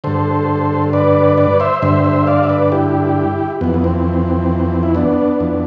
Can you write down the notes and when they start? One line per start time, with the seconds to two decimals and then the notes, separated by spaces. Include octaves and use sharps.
0.04 G2 D3 A4 C5
0.93 B4 D5
1.38 B4 D5
1.60 C5 E5
1.82 G2 D3 C5 E5
2.05 C5 E5
2.27 D5 F5
2.43 E5
2.49 B4 D5
2.72 E4 G4
3.61 F2 E3 B3
3.74 B3
3.84 C4
4.83 E4
4.95 B3 D4
5.40 F2 E3